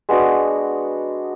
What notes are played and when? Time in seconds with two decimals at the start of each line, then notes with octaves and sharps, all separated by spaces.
0.09 G#3 B3 D4 F#4